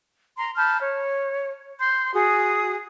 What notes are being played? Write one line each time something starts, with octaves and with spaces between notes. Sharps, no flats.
A#5 C6
A5 B5 F6 G6
C#5
C6 G6
F#4 G#4 D#6